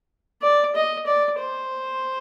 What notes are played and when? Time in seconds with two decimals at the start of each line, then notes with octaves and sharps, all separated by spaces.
0.42 D5
0.75 D#5
1.06 D5
1.39 C5